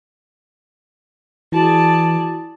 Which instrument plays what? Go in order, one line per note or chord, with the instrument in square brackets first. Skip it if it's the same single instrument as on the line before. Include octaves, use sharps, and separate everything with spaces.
[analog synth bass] E3 [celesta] E4 F#4 [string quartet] G#4 D5 A5